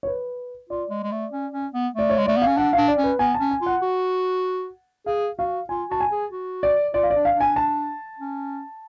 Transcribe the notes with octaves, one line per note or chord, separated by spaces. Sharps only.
C#5
B4
F4 D5
G#3
G#3
A3
C#4
C#4
B3
A3 D5
C#5
G#3
A3 D5
B3 F5
C#4
D4 F#5
D4 F5
D5
C#4
B4
B3 G#5
A5
C#4
G#5
F4 F#5
F#4
G#4 F5
F#4 F5
F4 G#5
F#4 A5
G#5
G#4
F#4
D5
F4 D5
F5
D5
D4
F5
D4 G#5
A5
C#4